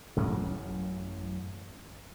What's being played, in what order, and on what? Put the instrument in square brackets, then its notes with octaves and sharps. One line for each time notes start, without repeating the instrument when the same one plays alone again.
[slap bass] A1 F#2 F#3 C#4